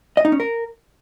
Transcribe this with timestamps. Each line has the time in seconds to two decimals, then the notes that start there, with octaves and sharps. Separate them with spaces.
0.17 D#5
0.25 D#4
0.32 C#4
0.40 A#4